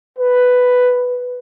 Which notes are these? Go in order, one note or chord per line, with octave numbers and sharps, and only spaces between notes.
B4